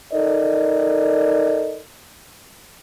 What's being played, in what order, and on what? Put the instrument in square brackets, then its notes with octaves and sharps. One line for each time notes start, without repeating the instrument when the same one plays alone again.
[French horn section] D#4 A4 A#4 D5 D#5